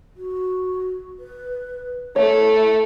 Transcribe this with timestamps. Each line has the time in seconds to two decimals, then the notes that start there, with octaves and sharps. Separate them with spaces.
0.17 F#4
1.19 B4
2.16 A3 E4 C#5